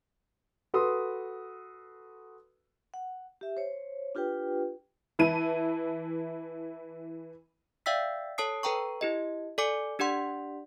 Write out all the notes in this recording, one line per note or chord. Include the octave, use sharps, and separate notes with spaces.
F#4 A4 B4 C6 D#6
F#5
G4 E5
C5 C#5
D4 F4 G4 B4 G5
E3 E4 A5 D#7
D5 E5 F5 G5 E6 B6
A4 C#5 A5 D#6 C7
A4 B4 G5 A#5 C#6
E4 G4 D#5
A4 D5 G#5 D6 C#7
D4 G4 D5 F#5 C6